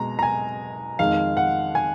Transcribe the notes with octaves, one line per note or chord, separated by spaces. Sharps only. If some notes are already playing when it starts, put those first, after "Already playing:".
Already playing: B2 G#3 A#5
A#5
G#5
F2 D#3 G#3 F5
F#5
G#5